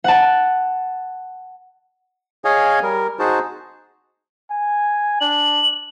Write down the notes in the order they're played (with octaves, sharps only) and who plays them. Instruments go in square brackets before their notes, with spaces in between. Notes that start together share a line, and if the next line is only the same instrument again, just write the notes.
[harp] F#5 A5
[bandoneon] G#4 C#5 D#5 F5 G#5
G3 A#4
D#4 F#4 G#4 C5 A5
[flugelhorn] G#5
[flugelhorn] D4 [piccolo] F#7